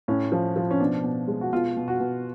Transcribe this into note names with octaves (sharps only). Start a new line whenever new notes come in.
A2 C#4
F3
F3
C#4
B2 D4
B2
G#3
F#4
B2 F4
B2
F#4
B2